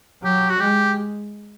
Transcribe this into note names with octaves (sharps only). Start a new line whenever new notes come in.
F#3 G4
F#4
G#3 G4